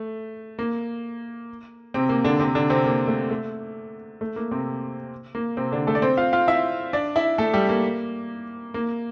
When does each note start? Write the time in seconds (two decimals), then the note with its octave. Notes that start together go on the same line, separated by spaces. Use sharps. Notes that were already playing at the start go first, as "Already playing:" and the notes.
Already playing: A3
0.59 A#3
1.94 C3 C4
2.09 A#3
2.24 D3 D4
2.40 C3 C4
2.55 D3 D4
2.70 C3 C4
2.85 A#3
3.08 A3
3.30 A3
4.21 A3
4.36 A#3
4.51 C3 C4
5.35 A#3
5.57 C3 C4
5.72 D3 D4
5.87 A3 A4
5.95 D5
6.02 C4 C5
6.17 F4 F5
6.33 F4 F5
6.48 E4 E5
6.93 D4 D5
7.16 E4 E5
7.38 A3 A4
7.53 G3 G4
7.69 A#3
8.74 A#3